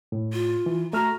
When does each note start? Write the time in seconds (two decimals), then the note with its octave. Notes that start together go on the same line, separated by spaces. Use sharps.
0.12 A2
0.33 F4
0.66 E3
0.93 A3 F#4 A#5 F6